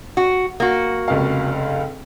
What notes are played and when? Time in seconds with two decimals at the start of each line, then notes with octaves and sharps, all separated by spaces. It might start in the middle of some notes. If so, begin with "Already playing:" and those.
0.17 F#4
0.60 A#3 F#4
1.08 F1 C#2 F5